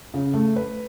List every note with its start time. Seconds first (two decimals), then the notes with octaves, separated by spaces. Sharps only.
0.14 C#3
0.34 A3
0.56 B4